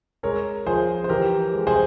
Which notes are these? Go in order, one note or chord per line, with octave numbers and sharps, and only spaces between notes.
G#3 A#4 C#5
F3 G#4 C5
C5
E3 G4 A#4
G#3
G#4 C5